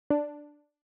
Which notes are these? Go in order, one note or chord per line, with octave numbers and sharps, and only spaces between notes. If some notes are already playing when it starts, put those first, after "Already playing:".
D4